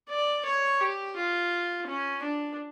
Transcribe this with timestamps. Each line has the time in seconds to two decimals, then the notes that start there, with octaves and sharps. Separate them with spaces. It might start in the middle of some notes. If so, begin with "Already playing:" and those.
0.10 D5
0.46 C#5
0.81 G4
1.16 F4
1.87 C#4
2.23 D4